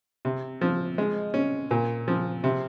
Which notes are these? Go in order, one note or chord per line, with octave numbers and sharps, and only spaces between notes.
C3
F3
G#3
C#4
A#2
F3
C3